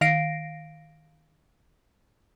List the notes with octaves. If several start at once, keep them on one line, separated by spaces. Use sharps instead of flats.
D#3 F5 A#6 C7 D7